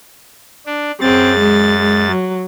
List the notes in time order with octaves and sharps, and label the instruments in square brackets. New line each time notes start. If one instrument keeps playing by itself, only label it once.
[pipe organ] D4
[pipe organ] F#2 A6 [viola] C4 G#4
[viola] G#3
G#3
F#3